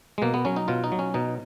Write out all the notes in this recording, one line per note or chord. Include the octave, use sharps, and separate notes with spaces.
G#3
B2 A#3
B3
F#3 C#4
D#4
B2 F4
D#4
F#3
C#4
B2 D#4